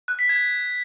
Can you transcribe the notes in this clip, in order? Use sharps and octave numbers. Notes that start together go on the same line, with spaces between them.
F#6
B6
G#6